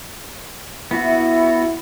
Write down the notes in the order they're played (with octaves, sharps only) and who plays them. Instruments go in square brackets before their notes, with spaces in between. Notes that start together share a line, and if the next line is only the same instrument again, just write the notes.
[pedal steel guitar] B3 F#4 [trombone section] E4